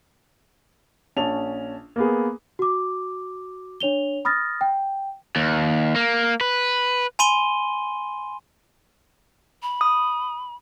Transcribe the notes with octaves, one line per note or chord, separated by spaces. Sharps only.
A#1 C#4 A5 F7
A#3 B3 G#4
F#4 D6
D4 C#5 F7 G7
B5 D#6 F6 A6 A#6
G5
D#2
A#3
B4
G#5 B5 C6 D#7 G7
B5
D#6